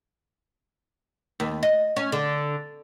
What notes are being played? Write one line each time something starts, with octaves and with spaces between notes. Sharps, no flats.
D#2
D#5
C#4
D3